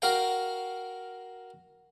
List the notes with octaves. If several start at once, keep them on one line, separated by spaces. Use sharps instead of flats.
F#4 A#4 F5 G5